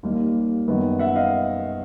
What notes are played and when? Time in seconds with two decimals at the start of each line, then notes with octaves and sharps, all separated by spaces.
0.03 D#2 D#3 G3 A#3
0.68 F#2 D#3 G3 B3
0.99 E5 F#5
1.16 D#5 F5